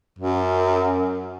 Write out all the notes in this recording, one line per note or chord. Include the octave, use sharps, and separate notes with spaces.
F#2